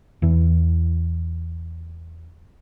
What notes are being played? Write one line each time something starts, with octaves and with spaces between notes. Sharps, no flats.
E2 E3